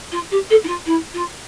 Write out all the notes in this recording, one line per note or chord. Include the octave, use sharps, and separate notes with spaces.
F4
G4
A4
E4
F4
E4
F4